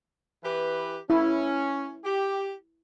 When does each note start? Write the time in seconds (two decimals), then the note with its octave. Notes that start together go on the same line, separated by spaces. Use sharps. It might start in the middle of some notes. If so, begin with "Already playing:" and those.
0.44 E3 G4 B4
1.10 C#4 E4
2.04 G4